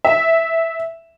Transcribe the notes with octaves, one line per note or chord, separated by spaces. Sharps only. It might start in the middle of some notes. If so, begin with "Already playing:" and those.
E5